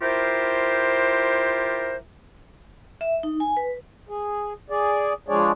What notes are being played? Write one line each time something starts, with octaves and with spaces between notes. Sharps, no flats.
E4 F4 G4 A#4 C5
E5
D#4
G#5
B4
G#4
G#4 D5
F3 G#3 D4 G#4 C#5 D5